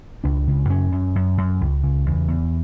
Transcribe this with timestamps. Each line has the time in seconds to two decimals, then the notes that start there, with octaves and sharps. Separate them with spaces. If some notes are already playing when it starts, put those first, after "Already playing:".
0.24 C#2 D4
0.47 C#3
0.69 F#2 C#4
0.92 F#2
1.15 F#2
1.38 F#2
1.61 C#2
1.84 C#3
2.06 E2
2.28 E2